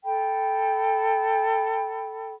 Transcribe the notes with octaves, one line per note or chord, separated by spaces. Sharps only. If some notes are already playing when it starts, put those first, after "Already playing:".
A4 G5 B5